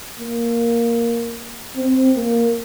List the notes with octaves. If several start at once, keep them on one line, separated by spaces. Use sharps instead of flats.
A#3
C4
A#3